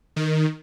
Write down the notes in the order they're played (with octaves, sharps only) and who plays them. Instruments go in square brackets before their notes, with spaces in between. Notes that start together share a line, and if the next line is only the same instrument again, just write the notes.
[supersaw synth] D#3